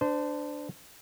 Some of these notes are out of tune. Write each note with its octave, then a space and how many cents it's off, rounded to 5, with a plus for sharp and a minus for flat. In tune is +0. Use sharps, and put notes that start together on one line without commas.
D4 +5 C5 -25